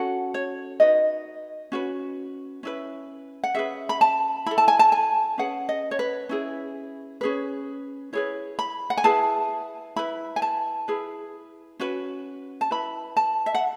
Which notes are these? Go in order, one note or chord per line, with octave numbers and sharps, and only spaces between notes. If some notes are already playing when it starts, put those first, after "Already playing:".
Already playing: C#4 F#4 A4 F#5
C#5
D#4 F#4 B4 D#5
C#4 F#4 B4
C#4 E4 B4
F#5
C#4 G#4 B4 E5
B5
A5
E4 A4 B5
A5
G#5
A5
G#5
C#4 G#4 B4 F#5
D#5
C#5
B4
C#4 E4 G#4
C#4 G#4 B4
E4 G#4 B4 C#5
B5
F#5
G#5
E4 G#4 B4 A5
E4 B4 B5
G#5
A5
E4 G#4 B4
C#4 F#4 B4
A5
E4 B4 B5
A5
E5
F#5